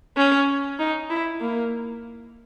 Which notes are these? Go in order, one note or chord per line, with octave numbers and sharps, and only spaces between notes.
C#4
D#4
E4
A#3